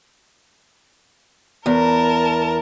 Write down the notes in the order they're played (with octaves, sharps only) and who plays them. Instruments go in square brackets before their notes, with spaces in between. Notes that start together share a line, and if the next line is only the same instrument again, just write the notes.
[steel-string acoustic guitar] E2 [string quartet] A#4 A5